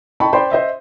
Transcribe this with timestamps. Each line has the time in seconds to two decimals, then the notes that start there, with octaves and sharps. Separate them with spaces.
0.20 D#5 G5 A5 B5 C#6
0.33 C5 D5 G5 B5 C6
0.51 C5 D#5 E5